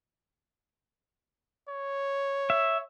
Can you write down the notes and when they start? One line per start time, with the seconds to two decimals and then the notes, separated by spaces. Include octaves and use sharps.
1.69 C#5
2.50 E5